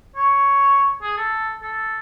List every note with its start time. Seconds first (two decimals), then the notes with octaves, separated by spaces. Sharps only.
0.16 C#5
1.02 G#4
1.18 A4
1.62 A4